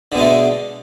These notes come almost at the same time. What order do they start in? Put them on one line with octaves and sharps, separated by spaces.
D3 B2 G#3 A3